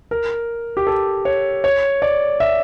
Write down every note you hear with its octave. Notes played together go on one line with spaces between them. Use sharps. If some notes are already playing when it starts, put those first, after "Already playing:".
A#4
G4
A4
C#5
C#5
D5
E5